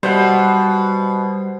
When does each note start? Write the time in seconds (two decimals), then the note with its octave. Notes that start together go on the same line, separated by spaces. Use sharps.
0.03 B2 G3 C5 F#5